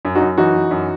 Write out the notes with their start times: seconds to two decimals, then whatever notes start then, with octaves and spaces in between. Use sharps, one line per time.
0.05 F#2
0.15 D#4 F#4
0.21 F#2
0.38 E3 D#4 F#4
0.55 E3
0.71 F#2